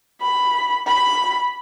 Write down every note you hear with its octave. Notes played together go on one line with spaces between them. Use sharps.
B5
B5